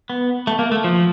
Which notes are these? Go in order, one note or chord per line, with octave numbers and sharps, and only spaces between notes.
B3
A3
A#3
A3
F3